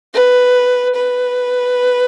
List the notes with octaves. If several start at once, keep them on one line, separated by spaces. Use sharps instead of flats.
B4
B4